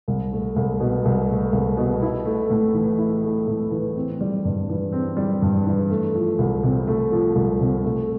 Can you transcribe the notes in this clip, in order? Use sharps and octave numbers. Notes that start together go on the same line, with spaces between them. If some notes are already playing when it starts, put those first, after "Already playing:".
C2
A3
C2
B2
C2
A3
C2
B2
E4
A3
A2
E3
E4
A3
A2
E3
C4
G3
G2
E3
C4
G3
G2
E3
A3
F3
C2
C3
A3
F3
C2
C3
A3